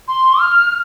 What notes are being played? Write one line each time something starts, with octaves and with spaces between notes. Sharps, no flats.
C6
F6